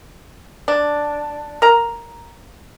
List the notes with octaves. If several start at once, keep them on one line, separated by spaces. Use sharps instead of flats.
D4
A#4 A#5